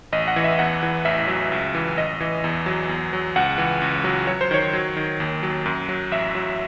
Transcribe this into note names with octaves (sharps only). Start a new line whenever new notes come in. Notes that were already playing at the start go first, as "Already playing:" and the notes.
A1 D#5
F#5
E3
E5
E2 F#5
E3
A1 E5
F#3
C#2
E3
A1 D#5
E3
E2
F#3
E2
F#3
C#2 F#5
E3
C#2
F#3
F#3 C#5
C5
D#3 C#5
F#3
D#3
D#2
F#3
F#2
F#3
A1 E5
F#3